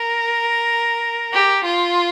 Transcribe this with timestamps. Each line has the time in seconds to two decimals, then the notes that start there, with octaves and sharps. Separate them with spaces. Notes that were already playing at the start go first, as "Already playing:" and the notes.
Already playing: A#4
1.34 G4
1.65 F4